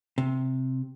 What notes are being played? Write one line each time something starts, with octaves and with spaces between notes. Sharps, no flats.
C3